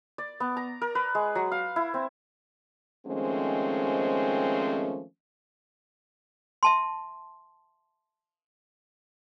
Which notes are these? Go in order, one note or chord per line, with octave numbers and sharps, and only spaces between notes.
D5
B3
A#5
A#4
B4
G#3
F#3
F5
E4
C4
D#3 F3 G#3 A3 C4 C#4
E5 A5 C6